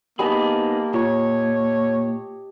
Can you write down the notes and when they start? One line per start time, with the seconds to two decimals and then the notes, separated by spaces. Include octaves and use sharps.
0.19 A#3 B3 D#4 G4 G#4 D#5 A5 B5
0.94 A#2 F4 C#5